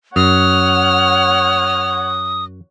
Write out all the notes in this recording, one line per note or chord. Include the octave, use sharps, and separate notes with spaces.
F#2 C#5 F#5 D#6 F6